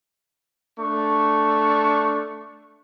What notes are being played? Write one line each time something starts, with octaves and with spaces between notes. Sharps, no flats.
A3 D4 C#6